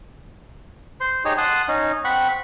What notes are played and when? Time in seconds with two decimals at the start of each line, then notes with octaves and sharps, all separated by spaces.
1.00 C5 C6
1.25 D#4 G4 G#4 C#5
1.38 F#5 A5 C6 D#6
1.68 C#4 D#4
2.05 C4 F#5 B5 C#6